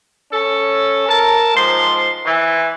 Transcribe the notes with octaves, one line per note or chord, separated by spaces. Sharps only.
C#4 A4
A#4 A5
G#2 F3 C6
E3